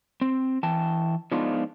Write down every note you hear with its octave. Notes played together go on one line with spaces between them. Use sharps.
C4
E3 G5 A5
F3 G#3 B3 D4 D#4 F4